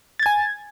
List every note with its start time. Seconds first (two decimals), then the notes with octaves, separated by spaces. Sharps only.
0.19 A6
0.23 G#6
0.26 G#5